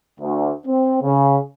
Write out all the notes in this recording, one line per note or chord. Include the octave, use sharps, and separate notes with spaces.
D2
C4
C#3